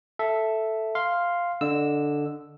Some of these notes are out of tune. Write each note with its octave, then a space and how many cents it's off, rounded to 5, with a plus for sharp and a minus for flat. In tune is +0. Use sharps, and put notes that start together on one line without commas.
A4 +0 E5 +0
F5 +0 C6 +0
D3 +0 D#5 -20 E6 +0